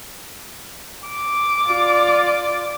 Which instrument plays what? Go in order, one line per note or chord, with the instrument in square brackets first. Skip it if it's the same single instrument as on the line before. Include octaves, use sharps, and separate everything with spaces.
[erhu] D6
[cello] F4 D5